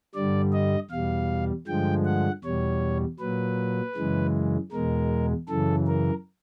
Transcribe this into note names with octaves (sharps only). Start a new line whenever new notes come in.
G2 D3 G3 D5
D#5
E2 B2 G3 F5
G2 D3 F3 G#3 G5
F#5
E2 B2 G3 C#5
A#2 F#3 B4
F#2 C#3 E3 G#3
E2 B2 G#3 A#4
F#2 C#3 E3 A4
A#4